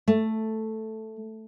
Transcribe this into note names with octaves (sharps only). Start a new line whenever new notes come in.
A3